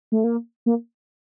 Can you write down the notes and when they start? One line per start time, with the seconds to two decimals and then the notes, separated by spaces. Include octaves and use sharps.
0.12 A3
0.24 A#3
0.66 A#3